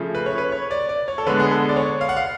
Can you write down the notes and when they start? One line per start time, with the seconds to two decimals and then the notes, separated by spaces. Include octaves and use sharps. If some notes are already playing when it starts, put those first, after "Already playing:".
Already playing: C#3 F3 A3
0.15 B4
0.26 C#5
0.38 B4
0.52 C#5
0.71 D5
0.89 D5
1.08 C#5
1.18 A4
1.26 D3 G#3 B3 B4
1.40 G#4
1.51 A4
1.69 D5
1.76 C#5
2.01 F5
2.09 F#5
2.17 F5